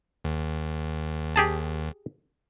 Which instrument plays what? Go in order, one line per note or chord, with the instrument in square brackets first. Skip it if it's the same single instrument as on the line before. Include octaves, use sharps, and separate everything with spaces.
[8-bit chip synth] D#2
[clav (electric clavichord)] G4 G#4 A5